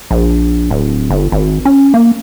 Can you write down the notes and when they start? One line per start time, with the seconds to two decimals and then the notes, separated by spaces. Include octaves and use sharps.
0.11 A#1
0.71 D1
1.10 G1
1.32 G#1
1.65 C#4
1.94 A#3